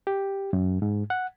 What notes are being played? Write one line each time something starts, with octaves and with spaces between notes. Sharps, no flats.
G4
F#2
G#2
F#5